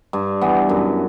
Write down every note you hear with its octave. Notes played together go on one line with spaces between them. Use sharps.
G2
E3 B3
F#2